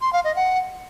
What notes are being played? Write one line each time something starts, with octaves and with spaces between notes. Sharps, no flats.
C6
F5
D#5
F#5